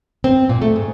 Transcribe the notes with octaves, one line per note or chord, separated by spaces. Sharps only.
C4
A#2
A3
G#2